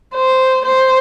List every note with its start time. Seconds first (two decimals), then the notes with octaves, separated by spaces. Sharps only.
0.15 C5
0.65 C5